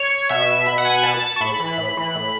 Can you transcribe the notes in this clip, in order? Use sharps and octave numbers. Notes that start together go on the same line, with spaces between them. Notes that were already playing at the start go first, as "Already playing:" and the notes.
Already playing: C#5
B2 E5
B2 B5
F#5
G#5
B2 A5
C#6
A2 B5
E3
A2
E3
A2